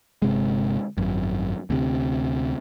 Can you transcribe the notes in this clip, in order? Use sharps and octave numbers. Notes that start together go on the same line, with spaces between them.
G1 C3 G#3
G#1 F#2
D2 C3